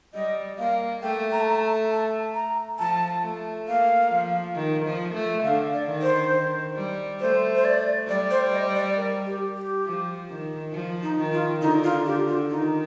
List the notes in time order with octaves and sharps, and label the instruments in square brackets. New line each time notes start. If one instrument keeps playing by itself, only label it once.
[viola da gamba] G3 [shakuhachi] D#5
[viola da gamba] A#3 [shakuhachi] F5
[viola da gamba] A3 [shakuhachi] G5
[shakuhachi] A#5
A5
A#5
A5
A#5
[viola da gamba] F3 [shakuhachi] A5
[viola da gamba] A3
[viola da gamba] A#3 [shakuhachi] F5
[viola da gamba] F3
D#3
F3
A3
[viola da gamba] D3 [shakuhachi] F5
[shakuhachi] D5
[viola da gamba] D#3
[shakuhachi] C5
[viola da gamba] D#3
G3
[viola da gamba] A3 [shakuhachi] C5
[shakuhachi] C5
D5
[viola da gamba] G3 [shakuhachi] D5
[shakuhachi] C5
D#5
D5
A#4
G4
G4
[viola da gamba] F3
D#3
F3
[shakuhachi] D#4
[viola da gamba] D#3
[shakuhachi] F4
[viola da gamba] D3 [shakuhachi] D#4
[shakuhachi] F4
[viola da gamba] D3 [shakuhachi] G4
[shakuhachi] F4
[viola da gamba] D#3 [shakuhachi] D#4